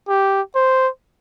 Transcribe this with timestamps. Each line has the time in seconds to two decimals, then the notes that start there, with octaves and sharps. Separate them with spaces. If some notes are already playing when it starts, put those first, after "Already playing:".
0.09 G4
0.55 C5